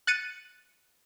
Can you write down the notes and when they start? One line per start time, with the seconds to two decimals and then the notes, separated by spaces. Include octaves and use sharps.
0.07 F#6 A6 C#7 D#7